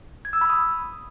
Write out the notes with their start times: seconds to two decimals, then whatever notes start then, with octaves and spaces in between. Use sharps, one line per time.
0.25 G#6
0.33 E6
0.41 B5
0.50 D#6